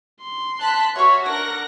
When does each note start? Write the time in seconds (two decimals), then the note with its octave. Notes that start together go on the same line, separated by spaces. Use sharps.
0.21 C6
0.59 A5 F#6 B6
0.96 F#4 C#5 E5 F5 C#6
1.26 D4 A#4 F#5 A#6